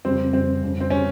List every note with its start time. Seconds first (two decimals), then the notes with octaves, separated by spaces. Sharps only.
0.05 F2 C#3 G3 C4
0.33 F2 C#3 G3 C4
0.62 F2 C#3 G3
0.80 C4
0.90 C#3 G3 C#4